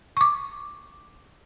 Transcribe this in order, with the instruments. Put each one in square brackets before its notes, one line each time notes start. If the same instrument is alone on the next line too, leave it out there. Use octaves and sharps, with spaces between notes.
[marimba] C#6 D6